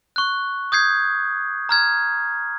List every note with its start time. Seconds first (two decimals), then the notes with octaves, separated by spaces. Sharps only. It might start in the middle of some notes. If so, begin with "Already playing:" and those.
0.16 C#6 F#6
0.72 D#6 G6 G#6 C7
1.69 A#5 F6 G#6